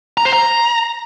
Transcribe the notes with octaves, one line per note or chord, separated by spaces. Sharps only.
A#5
C5
A#5